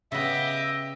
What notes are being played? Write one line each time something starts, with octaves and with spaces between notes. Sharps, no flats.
C#3 B3 G4 D#5 E5